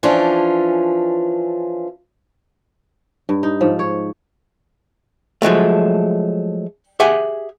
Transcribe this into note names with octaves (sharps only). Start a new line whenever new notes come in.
E3 F3 C#4 D4 F4
G2
D#4
G#2 F3
C#5
F3 F#3 G#3 A3
G4 G#4 E5 F#5 G#5